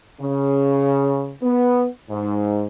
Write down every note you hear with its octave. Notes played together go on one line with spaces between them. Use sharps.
C#3
B3
G#2